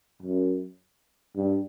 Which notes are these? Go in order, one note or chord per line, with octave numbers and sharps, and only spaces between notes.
F#2
G2